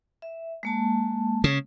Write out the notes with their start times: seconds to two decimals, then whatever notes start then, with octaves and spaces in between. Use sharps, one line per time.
0.22 E5
0.63 G#3 A#3 A5
1.44 C#3